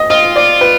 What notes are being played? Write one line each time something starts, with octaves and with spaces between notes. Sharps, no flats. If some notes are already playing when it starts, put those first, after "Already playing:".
Already playing: D#5
F4 D#5
D5
B4